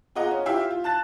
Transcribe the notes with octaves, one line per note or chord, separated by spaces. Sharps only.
F4 G#4 D#5 F#5 A#5
C#4
E4 F4 G4 E5 F5
F4
A5 F#6 A6 E7